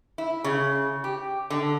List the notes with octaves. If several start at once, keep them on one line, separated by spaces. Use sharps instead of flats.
E4
C#3
G4
D3